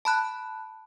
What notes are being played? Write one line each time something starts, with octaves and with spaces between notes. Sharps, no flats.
A5 B5 F#6